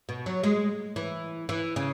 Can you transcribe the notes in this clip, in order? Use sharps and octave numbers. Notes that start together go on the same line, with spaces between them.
B2
F#3
G#3
E3
E3
C#3